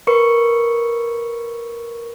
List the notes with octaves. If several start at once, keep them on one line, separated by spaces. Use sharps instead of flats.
A#4 B4 C#6 C#7